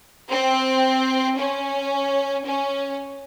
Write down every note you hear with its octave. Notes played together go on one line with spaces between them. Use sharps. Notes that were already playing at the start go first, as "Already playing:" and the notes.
C4
C#4
C#4